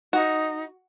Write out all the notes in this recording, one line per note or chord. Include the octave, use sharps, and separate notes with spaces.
D#4 F#4